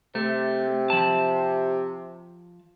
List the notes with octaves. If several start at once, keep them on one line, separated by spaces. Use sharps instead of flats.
C3 A3
F3 A5